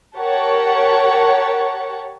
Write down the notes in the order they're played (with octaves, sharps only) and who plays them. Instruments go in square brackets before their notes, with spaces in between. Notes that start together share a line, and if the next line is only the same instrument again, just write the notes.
[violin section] G4 A#4 C#5 F#5 A5